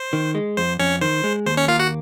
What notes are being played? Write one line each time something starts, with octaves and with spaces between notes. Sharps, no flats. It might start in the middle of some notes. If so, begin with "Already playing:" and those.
Already playing: C5
D#3
G#3
F2 C5
F2 C#4 C#5
D#3 C5
G#3
D#2 C5
C#4 C#5
A#3 F4 F5
F#4 F#5